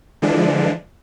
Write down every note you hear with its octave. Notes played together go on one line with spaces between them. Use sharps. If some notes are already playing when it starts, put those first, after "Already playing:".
D3 E3 F3 G#3 D4